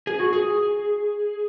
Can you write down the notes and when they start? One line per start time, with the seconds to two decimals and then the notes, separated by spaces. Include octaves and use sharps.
0.07 G#4
0.20 F#4
0.33 G#4